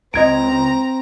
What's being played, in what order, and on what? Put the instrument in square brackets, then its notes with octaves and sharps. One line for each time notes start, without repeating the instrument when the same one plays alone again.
[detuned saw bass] C#2 [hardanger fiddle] C4 A#5 [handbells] D#5 G#6 D7